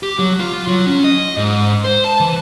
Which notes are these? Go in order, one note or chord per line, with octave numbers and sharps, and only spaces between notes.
G4
F#3
F4
F#3
C#4
D#5
G#2
C5
A5
E3